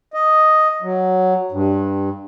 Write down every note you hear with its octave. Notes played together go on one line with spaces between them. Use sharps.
D#5
F#3
G2